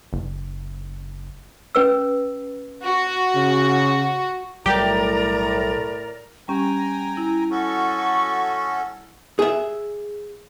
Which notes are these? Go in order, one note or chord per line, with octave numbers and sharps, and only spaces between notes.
F#1
C#4 B4 E6
F#4
C#3
B1 A2 F#3 G3 G4 A#4 D5 A#5
G3 C#4 G4 G5 G#5 A#5
E4
C#4 F#4 A4 C#6
G#4 E5